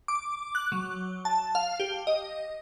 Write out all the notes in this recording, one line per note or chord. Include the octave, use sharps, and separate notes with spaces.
D6
F#6
F#3
A5
F5
G4
D#5